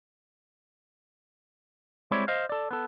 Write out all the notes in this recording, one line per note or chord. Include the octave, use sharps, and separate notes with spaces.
G3 G#3 C4 E4 C#5 D5
C5 D#5 F5
A4 D5
B3 A4